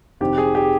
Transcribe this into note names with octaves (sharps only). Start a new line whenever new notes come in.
F1 F2 D#3 G4
G#4
G4